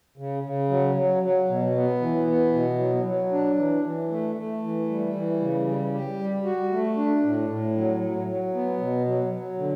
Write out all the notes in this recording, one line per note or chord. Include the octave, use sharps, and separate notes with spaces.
C#3
C#3
F#3
F#3
F#3
B2
B3
E3
B3
B2
F#3
F#3
D4
E3
E3
A3
A3
E3
G3
E3
C#3
G3
G4
G3
F#4
A3
D4
A2
A2
F#3
F#3
F#3
B3
B2
F#3
F#3
D3